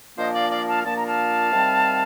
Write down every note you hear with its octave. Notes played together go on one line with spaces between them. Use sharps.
A#2 F3 A#3 D4 C5 D#5
D5 F5
D5 F5
F5 A5
A#2 F3 A#3 D4 A5
A#5
F5 A5
C3 D#3 G3 C4